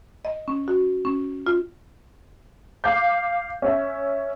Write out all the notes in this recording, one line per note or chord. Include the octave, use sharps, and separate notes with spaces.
D#5
C#4
F#4
C#4
F4
F5 D6 G6
C#4 E5